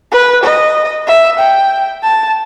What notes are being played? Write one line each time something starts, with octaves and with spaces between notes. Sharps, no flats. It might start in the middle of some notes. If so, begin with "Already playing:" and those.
B4
D#5
E5
G5
A5